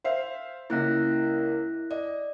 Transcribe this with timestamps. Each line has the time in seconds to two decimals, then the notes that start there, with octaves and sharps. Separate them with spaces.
0.04 C5 E5 F5
0.70 C#2 A#3 E4 F#6 A#6
1.91 D5 D#5